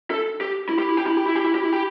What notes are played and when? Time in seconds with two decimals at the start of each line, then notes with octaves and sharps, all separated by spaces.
0.11 A4
0.41 G4
0.69 E4
0.79 G4
0.89 E4
0.97 G4
1.07 E4
1.17 G4
1.26 E4
1.36 G4
1.44 E4
1.55 G4
1.63 E4
1.73 G4